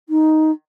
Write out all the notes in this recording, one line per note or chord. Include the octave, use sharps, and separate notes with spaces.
D#4